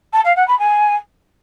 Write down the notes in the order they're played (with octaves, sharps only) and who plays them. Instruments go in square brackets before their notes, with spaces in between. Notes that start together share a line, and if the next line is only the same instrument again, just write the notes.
[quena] A5
F5
F#5
B5
G#5